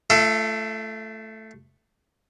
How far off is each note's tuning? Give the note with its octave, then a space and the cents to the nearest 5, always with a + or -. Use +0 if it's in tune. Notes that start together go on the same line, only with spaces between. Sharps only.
A3 +0 F4 -40 A4 +0